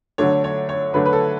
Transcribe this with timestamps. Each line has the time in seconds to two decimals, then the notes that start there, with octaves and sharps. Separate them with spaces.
0.18 D3 F#3 A3 D4 C#5
0.44 C#5
0.69 C#5
0.94 D3 F#3 A3 D4 B4
1.06 B4
1.13 A4